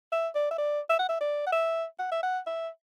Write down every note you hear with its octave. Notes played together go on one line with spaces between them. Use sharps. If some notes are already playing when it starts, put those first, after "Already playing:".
E5
D5
E5
D5
E5
F#5
E5
D5
F#5
E5
F#5
E5
F#5
E5